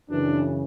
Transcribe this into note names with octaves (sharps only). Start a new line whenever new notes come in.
F#2 C#3 E3 D4